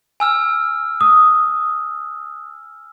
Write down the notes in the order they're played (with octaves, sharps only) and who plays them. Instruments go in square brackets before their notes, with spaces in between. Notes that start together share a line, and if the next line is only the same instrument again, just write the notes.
[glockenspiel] G#5 E6 F6
[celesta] D#6